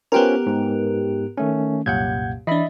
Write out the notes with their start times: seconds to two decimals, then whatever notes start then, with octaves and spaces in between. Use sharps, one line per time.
0.12 B3 C#4 F4 G4 A#4 C5
0.46 G#2
1.38 D#3 A3 C#4
1.86 C2 F#2 A#2 F#5 G6 G#6
2.47 E3 D4 D#5 E5 B5